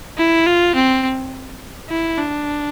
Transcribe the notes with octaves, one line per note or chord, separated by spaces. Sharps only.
E4
F4
C4
E4
D4